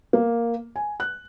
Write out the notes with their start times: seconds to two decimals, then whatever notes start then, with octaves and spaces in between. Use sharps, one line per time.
0.13 A#3
0.76 G#5
1.00 F#6